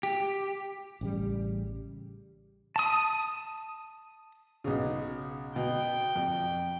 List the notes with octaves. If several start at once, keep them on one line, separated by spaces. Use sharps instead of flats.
G4
A1 C#3 G3
A5 D#6
B1 C#3
B2 G5
F2